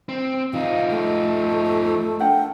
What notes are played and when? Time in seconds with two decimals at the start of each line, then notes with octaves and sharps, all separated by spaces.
0.09 C4
0.54 F3 D#4 F5
0.90 A3
2.20 D4 A#4 F#5 G5